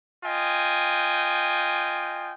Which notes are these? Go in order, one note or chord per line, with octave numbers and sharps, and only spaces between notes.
F4 D#5 G5 G#5